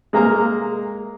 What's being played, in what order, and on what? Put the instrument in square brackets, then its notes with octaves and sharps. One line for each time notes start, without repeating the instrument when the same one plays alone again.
[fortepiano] G#3 A#3 A#4 A#5